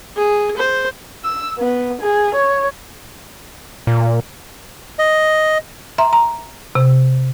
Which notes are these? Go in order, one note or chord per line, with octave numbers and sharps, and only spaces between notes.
G#4
C5
E6
B3
G#4
C#5
A#2
D#5
E5 A#5 C6
A#5
C3